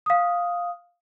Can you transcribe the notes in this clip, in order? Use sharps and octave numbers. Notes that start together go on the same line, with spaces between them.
F5 D#6